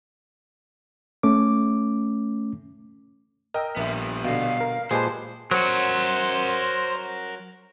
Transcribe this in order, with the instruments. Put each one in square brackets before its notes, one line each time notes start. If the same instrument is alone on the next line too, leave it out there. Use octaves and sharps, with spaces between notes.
[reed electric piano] A3 C#4 D6
[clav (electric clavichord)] A#4 [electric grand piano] D#5 G5 E6
[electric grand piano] A#1 E5 [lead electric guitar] G3 B3
[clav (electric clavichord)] B2 D3 [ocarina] F5
[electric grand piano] A#4
[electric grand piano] A#2 B4 A5 [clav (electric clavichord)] G#3 G4 G#4 [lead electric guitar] C5
[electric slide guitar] F#3 [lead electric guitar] A#4 F#5 [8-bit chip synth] C5